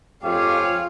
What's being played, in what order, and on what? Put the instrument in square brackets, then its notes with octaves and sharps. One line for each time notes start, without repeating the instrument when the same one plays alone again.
[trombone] F2 [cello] F4 [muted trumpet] G4 [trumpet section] G#4 C#5 F5